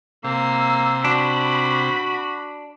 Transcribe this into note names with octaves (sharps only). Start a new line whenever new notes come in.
C3 A#3 E6 C7
D4 F#4 B5